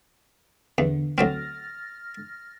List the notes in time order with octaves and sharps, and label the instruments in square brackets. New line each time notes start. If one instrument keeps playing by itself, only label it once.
[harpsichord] E2 [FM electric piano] D3 B3
[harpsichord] D2 F#3 C4 [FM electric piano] F6 A6 A#6